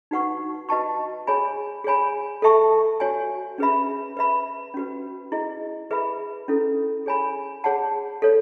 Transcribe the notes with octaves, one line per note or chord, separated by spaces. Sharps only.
D#4 F#4 B4 F#5 C#6
F#4 B4 D#5 A5 C#6
G#4 C#5 G#5 B5
G#4 C#5 G#5 B5
A4 E5 A5 C#6
F#4 C#5 G#5
C#4 G#4 B4 E5 B5
B4 E5 B5
C#4 F#4 B4
E4 G#4 D#5
G#4 B4 E5 B5
C#4 E4 A4
G#4 C#5 G#5 B5
G#4 C#5 F#5 A5
A4 C#5